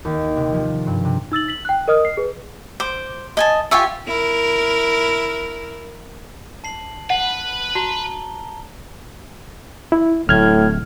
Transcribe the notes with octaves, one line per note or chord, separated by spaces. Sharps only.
D#2
C3
F3
G2
C3
D#4 E6 A6 F#7
B6 F#7
G5 F#6
A#4 D#5 D#6 F6
C7
G#4 B4
C5 D6
D#5 G#5 A5
F4 G4 E5 G#5 C#6
E4 A#4
A5 C7 F#7
B4 F#5
F#4 A5 A#5 G7
E4
D1 A2 F6 G#6